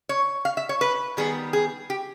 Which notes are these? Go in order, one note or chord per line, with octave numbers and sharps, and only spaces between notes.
C#5
F5
E5
C#5
B4
D#3 G3 B3 G#4
G#4
G4